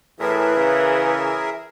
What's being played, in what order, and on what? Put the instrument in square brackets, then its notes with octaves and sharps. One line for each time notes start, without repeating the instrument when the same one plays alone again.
[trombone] A2 [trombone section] E3 [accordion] G#4 A#4 E5 [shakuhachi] B4
[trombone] C#3